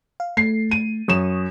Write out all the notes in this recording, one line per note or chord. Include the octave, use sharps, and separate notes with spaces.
F5
A3 C7
D#7
F#2 C#6 D#6 E7